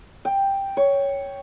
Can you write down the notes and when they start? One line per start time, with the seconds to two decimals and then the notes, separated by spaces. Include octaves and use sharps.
0.25 G5
0.77 C#5